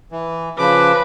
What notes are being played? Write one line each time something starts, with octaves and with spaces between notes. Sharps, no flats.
E3
C#3 F3 B4 D6